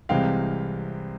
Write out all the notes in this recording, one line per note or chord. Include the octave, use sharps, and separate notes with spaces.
C2 C3 E3 G#3 C4 F5 G5